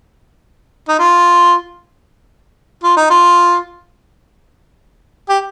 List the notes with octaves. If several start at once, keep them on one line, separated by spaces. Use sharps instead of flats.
D#4
F4
F4
D#4
F4
G4